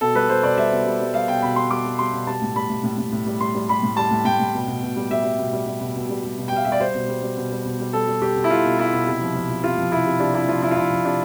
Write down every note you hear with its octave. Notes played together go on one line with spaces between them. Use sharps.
B2 A4
G3 B4
G3 C5
B2 D5
G3 E5
B2
G3
G3
G3 F5
B2 G5
B2 B5
G3 C6
G3 D6
G3
G3 C6
B2
G3 A5
A2
G3 B5
A2
A2
A2
A2
G3
G3 C6
G3
G3 B5
A2
G3 A5
A2
A2 G5
A2
B2
B2
B2
G3
G3 E5
G3
B2
G3
G3
B2
B2
G3
G3
B2
G5
G3 F5
G3 E5
D5
G3 C5
B2
G3
G3
B2
G3
B2
G3
G3 A4
G3
G3 G4
B2
E4
G3 F4
B2
G3 E4
B2
C3
F3
F3
F3
C3 F4
F3
C3 E4
C3
C3 D4
C3 E4
F3 F4
F3 E4
F4
F3 E4
F3
C3 D4